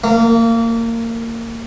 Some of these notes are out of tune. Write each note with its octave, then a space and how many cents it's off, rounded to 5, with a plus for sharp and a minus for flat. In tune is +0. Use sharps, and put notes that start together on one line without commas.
A#3 -25